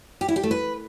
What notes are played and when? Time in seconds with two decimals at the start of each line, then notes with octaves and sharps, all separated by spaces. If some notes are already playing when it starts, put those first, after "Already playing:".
0.21 G4
0.28 E4
0.36 G4
0.43 A3
0.51 B4